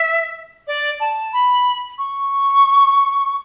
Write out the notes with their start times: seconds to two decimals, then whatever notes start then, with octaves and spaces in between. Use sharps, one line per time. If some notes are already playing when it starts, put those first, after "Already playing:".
Already playing: E5
0.67 D5
1.00 A5
1.33 B5
1.98 C#6